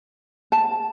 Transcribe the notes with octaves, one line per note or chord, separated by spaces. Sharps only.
A5